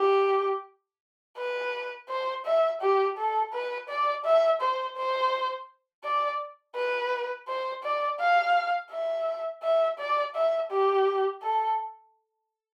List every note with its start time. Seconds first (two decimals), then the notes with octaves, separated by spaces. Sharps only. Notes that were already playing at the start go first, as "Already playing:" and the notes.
Already playing: G4
1.38 B4
2.09 C5
2.46 E5
2.81 G4
3.17 A4
3.53 B4
3.89 D5
4.24 E5
4.61 C5
4.96 C5
6.04 D5
6.75 B4
7.48 C5
7.83 D5
8.19 F5
8.91 E5
9.63 E5
9.99 D5
10.35 E5
10.70 G4
11.42 A4